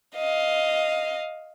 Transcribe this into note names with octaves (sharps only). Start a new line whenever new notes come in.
D#5 F5